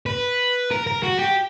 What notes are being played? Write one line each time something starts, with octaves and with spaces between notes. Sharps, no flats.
B4
A#4
A#4
F#4
G4